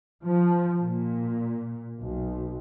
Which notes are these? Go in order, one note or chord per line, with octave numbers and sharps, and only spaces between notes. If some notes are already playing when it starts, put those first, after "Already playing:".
F3
A#2
B1